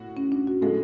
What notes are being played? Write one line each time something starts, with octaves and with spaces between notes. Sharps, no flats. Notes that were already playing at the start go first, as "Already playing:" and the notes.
Already playing: A2 F#4
C#4
D4
F#4
A2 F3 G#3 C#4 F#4 A4